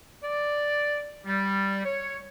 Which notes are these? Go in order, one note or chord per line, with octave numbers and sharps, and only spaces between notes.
D5
G3
C#5